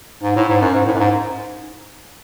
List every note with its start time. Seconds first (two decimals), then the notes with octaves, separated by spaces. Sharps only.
0.23 G#2
0.36 A2
0.49 G#2
0.61 F#2
0.74 G#2
0.86 A2
0.94 F#2
0.99 G#2